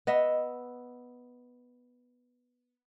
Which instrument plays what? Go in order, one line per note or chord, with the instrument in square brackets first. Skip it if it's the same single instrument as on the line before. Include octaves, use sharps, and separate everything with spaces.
[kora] B3 D#5 E5